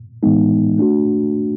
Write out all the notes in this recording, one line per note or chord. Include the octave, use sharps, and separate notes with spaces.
A2 E3 G#3 B3 D#4
A3 D4 F#4